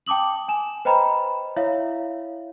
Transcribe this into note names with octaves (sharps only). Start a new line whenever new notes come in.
G5 A5 D6 D#6 F#7
G#5 E7
B4 C5 D#5 G5 A#5 B5
E4 C#5 E5 F5